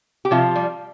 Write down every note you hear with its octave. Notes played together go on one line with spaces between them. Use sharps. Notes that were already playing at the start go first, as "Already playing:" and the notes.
G4
C3 F3 F4
G3